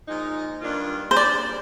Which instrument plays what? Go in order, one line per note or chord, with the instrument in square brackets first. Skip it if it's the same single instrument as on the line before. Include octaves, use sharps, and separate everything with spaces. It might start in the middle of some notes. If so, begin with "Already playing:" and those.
[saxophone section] A#2 F3 G#3 D#4
G2 D#3 A#3 D4 F4
[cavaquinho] C5
[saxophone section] A#2 G3 D4 [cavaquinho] D5